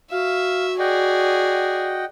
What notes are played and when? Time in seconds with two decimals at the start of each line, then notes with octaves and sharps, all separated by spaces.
0.12 F#4 E5 F5
0.79 G#4 D5 D#5 F#5 G5